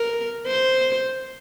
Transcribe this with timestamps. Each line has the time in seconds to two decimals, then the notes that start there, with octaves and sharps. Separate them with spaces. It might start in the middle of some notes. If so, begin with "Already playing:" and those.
Already playing: A#4
0.47 C5